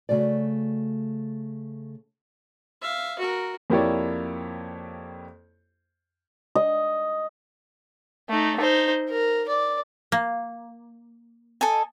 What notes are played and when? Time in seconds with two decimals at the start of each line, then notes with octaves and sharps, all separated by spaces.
0.09 C#3 A3 F#4 D5
2.82 E5 F5
3.19 F#4 A#4
3.70 F2 A#3 E4 G4 C#5 D5
6.55 D#5
8.29 A3 D#4
8.59 D#4 C5
9.10 A#4
9.48 D5
10.12 A#3
11.61 A4 D#5 G#5